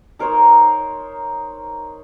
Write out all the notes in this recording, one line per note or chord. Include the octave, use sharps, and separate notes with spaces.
D#4 A#4 C5 C#5